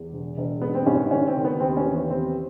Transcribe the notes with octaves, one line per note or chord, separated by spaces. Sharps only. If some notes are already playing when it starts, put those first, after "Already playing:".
Already playing: E2
E1
E1
G#2 B3
C4
G#1 C#4
D#3 C#4
C4
D#3
B3
D#2 C4
C#4
E3
B3
D#2 C4